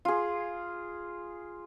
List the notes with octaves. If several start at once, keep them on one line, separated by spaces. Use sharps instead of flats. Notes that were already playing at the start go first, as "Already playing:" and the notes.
F4 G#4